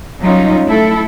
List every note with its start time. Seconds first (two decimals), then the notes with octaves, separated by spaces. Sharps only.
0.20 F#3 G3 C#4 D#4 F4
0.65 A3 E4 A4